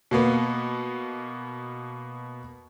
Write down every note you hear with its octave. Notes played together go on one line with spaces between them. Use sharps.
B2 A#3 B3